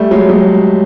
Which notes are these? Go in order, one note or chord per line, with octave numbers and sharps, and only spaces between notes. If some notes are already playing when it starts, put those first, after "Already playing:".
Already playing: G3 A3
F#3 G#3
F#3 G#3